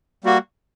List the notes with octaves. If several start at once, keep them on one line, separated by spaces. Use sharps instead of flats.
G3 A#3 F#4